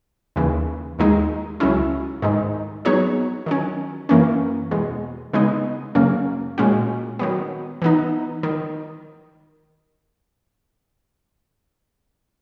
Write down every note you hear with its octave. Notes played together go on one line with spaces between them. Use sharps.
D#2 C#3 E3
D#2 D#3 G#3 D#4
C#2 C#3 F#3 C#4 E4
G#2 D#3 G#3
F#3 B3 D#4 G#4 C#5
D#3 F#3 C#4
F#2 E3 A#3 C#4
E2 B2 G#3
C#3 G#3 B3 D#4
F#2 C#3 F#3 A#3 C#4
A#2 G#3 C#4 F#4
D#3 F#3 B3
E3 B3 D#4
D#3